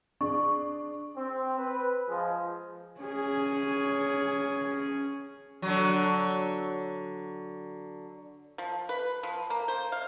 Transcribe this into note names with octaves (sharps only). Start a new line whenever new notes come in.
D4 G#4 C#6
C4
B4
F3 G#3
C#4 G#4
D3 F#3
F3
B4
F3
A#3
C5
F5